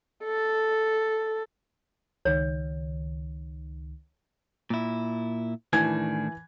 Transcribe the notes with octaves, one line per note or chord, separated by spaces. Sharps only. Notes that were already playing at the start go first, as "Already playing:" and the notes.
A4
C#2 D#3 C#5
A#2 E4
A2 D#3 E3 D4 G#5 G#6